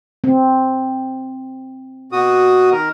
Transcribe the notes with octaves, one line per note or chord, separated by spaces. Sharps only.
C4
B2 F#4 D#6
D#3 A#4